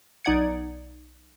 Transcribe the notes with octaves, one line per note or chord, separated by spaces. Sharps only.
B1 D#4 D5 F#5 G#6 C#7